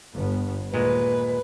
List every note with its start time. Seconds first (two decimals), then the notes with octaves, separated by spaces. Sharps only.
0.15 G1 B3
0.74 D#2 A#2 G#3 B4